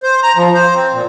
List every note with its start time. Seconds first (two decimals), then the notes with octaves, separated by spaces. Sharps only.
0.03 C5
0.23 A#5
0.36 F3
0.54 C5
0.75 C4
0.93 A#2